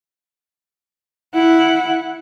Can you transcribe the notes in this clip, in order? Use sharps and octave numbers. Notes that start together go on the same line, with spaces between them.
E4 F#5